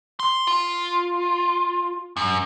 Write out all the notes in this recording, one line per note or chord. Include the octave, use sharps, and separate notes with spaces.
C6
F4
F#2